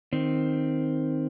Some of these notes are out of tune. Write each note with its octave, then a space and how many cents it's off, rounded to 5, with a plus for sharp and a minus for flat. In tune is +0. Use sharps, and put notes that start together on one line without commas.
D#3 +0 C4 +0